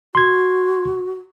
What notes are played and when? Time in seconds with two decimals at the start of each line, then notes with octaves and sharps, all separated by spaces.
0.15 F#4 C6 G#6